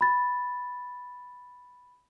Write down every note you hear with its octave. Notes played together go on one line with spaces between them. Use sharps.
B5 A6